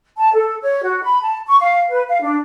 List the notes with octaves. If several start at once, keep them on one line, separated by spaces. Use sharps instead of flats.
A5
A4
C#5
F#4
B5
A5
C#6
F5
B4
F5
D4